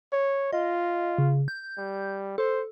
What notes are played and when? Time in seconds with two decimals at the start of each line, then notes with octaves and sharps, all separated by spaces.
0.12 C#5
0.53 F4 D#5
1.18 C#3
1.48 G6
1.77 G3
2.38 A4 C5